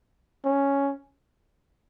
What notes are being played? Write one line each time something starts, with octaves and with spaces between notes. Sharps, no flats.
C#4